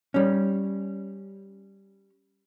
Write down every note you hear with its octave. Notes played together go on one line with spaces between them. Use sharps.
G3 C#4